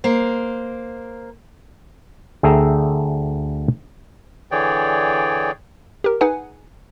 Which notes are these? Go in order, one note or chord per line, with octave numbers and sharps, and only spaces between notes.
A#3 C5
D2 G#4 A4 E5 G5 A#5
D3 E3 G#4 C#5 D5 G5
G4 A#4
D#4 G#4 B4 F#5 G#5